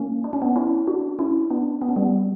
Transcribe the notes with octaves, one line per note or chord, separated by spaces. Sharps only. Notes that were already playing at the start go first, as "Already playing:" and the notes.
Already playing: A#3 C#4
D4
C#4
B3 D4
C#4 E4
D4 F#4
C#4 E4
B3 D4
B3
C#4
G3 B3